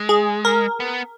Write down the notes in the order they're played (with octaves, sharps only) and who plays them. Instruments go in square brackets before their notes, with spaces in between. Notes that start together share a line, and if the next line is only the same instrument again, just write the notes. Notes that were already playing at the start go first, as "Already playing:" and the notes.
Already playing: [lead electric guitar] G#3
[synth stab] G#4
A#4
[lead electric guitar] B3